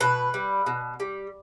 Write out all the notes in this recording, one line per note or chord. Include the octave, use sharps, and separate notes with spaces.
B2 B4
G3
B2
G3